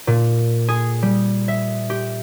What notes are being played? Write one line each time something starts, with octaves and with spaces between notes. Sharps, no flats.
A#2
G#4
G3
E5
G4